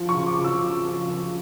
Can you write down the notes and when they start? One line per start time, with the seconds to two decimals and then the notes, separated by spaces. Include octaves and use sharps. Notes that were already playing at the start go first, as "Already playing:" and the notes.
Already playing: F3
0.09 C#6
0.14 C#3
0.27 D6
0.38 C#3
0.44 E6
0.63 C#3
0.86 F3
1.10 F3